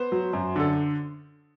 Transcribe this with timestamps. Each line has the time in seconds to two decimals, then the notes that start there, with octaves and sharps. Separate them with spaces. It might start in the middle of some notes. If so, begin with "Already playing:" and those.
Already playing: B3 C5
0.12 F#3
0.33 F#2
0.56 D3 A4